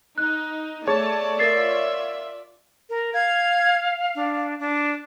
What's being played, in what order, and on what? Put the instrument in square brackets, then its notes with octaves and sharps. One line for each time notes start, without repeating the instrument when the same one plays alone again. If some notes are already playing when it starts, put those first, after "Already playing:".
[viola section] D#4 [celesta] F#6
[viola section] A3 A5 [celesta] G#4 [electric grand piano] C#5 [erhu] D5
[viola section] F4 E5 [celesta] A#4 A6 C7
[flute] A#4
[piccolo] F5 [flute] G#6
[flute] D4
D4